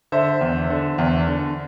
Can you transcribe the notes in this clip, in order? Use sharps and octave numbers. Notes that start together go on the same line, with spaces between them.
D3 C5 E5
E2
D3
E2
D3